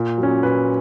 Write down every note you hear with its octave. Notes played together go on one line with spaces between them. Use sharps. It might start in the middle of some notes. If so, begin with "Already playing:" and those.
Already playing: A#2
F#3
C#4
A#2 B4